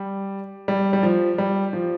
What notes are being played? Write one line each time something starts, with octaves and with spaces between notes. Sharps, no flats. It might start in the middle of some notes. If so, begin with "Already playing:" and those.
Already playing: G3
G3
G3
F3
G3
F3